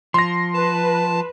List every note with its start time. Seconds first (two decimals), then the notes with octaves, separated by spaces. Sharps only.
0.14 F3 C6 A#6
0.54 B4 A5